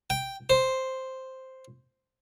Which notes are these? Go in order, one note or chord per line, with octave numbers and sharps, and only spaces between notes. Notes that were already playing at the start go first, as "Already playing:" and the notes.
G5
C5